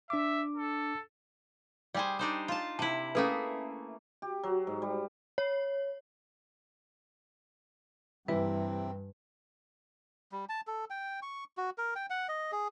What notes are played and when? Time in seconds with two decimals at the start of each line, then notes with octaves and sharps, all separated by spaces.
0.10 D4 E5 D6
0.57 A4
1.94 G3 G#4 C5 D5 G5
2.19 D4 D#4 C5
2.48 F4 A5
2.79 C3 E4 A5
3.15 A3 A#3 C#4 G#4 A4 B4
4.22 G4
4.43 F#3
4.67 G#2
4.82 G3
5.38 C#5
8.28 G2 C3 E3 G3 C4 E4 B4
10.32 G3
10.49 A5
10.67 A4
10.90 G5
11.22 C#6
11.57 F#4
11.78 A#4
11.96 G5
12.10 F#5
12.29 D#5
12.52 G#4